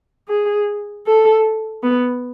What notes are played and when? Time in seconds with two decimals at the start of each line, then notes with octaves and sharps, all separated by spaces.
0.29 G#4
1.07 A4
1.83 B3